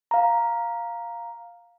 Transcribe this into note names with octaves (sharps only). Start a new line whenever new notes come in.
F5 A#5